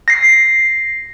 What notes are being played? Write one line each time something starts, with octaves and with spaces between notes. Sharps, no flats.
A#6 C7